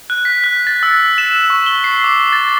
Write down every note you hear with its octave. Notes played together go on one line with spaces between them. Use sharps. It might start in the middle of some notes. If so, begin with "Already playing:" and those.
F#6
B6
F#6
A6
E6
E7
C#6
G7
C7
D6
A6